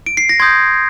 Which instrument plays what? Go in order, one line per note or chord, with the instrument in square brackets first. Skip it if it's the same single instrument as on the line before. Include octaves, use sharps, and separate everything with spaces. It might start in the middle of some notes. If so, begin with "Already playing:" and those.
[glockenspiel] D7
C7
A#6
C6 D#6 G6 G#6